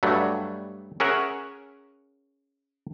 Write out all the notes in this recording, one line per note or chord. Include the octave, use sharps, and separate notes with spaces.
G2 F#3 G3 A3
C#4 G#4 A#4 C#5 E5 F#5